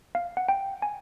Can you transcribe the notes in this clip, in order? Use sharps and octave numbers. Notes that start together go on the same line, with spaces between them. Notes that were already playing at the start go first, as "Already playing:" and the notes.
F5
F#5
G5
G#5